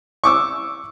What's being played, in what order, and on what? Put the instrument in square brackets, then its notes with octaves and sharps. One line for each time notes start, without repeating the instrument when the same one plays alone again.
[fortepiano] C#6 D6 E6